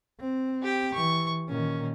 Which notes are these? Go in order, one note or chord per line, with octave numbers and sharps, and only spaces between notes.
C4
G4 G5
E3 C#6
A#2 D#3 C#4